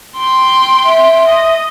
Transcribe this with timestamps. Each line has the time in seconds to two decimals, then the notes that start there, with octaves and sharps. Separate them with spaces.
0.17 G5 C6
0.85 E5
1.27 D#5